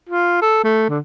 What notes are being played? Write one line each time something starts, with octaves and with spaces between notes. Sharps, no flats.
F4
A4
A3
D3